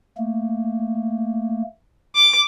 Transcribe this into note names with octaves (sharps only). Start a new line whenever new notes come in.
A3 A#3
D6